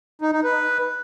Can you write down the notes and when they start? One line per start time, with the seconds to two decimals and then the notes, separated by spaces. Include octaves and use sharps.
0.22 D#4
0.33 D#4
0.44 B4